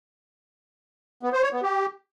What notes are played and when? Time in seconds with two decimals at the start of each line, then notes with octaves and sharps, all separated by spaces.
1.23 B3
1.33 C5
1.43 C#5
1.53 B3
1.63 G4